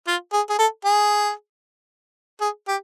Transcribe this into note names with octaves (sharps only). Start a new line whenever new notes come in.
F4
G#4
G#4
A4
G#4
G#4
G4